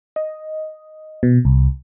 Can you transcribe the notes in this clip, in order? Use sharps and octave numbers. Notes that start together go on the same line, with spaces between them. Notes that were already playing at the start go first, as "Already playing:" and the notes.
D#5
B2
C2